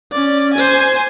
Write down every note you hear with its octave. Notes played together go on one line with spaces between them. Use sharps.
C#4 D5
C5 G#5